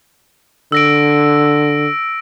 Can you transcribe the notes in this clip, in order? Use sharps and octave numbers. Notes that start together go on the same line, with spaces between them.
D3 E6 A#6 D7